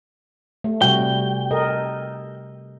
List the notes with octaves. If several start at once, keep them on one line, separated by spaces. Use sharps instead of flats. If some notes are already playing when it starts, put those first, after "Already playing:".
A3
C3 G3 F#4 G5
A4 A#4 D#5